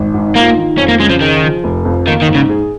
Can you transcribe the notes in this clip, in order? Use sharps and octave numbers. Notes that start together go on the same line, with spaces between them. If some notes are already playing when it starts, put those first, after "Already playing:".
Already playing: G#1
G#2
A#3 F4
D#3
F2 C#4
A#3
C#3 G#3
F3
D#3 G#4
F3
F1
F2
D#3 A#3
D#3
G#2
C#3
G#4